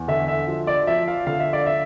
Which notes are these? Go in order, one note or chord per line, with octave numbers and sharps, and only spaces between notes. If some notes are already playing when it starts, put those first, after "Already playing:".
Already playing: E2
D3 E5
E5
F3
D5
F3 E5
F5
D3 F5
E5
D5
E5